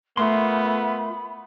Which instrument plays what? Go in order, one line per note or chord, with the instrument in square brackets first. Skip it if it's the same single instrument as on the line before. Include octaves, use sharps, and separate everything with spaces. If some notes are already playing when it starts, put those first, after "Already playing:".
[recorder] A3 [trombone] B3 [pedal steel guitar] F4 A#4 C6 [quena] B5